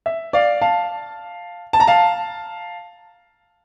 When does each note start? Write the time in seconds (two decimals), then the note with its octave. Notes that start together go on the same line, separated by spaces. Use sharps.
0.06 E5
0.33 D5 F5
0.61 F5 A5
1.73 A5
1.80 A#5
1.87 F5 A5